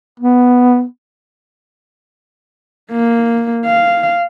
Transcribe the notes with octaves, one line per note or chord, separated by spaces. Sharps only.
B3
A#3
F5